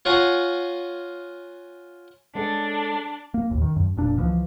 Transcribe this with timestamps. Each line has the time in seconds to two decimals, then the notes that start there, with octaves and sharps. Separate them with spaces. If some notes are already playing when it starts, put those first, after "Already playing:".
0.05 F4 C#5 F5 F#5 G#5 A#5
2.35 G#3 C#4 D4 A4
3.34 A#3
3.50 A1 D#2
3.62 D#3
3.76 F#2
3.96 F1 A#2 D4
4.18 C#2 E3 F3